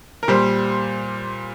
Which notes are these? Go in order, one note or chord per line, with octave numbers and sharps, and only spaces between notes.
A#4
A#2 G3 C5